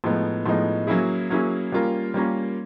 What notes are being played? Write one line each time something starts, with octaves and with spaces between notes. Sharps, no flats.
A2 F3 G#3 B3 D#4
A2 F3 G#3 B3 D#4
F#3 A#3 C#4 E4 G#4
F#3 A#3 C#4 E4 G#4
G3 A#3 C#4 F4 A#4
G3 A#3 C#4 F4 A#4